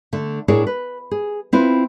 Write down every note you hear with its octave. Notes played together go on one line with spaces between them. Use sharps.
D3 A3
A2 D4 E4 G#4 A#4 C#5
B4
G#4
C4 E4 F4 B4